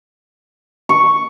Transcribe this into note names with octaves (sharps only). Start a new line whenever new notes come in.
C#6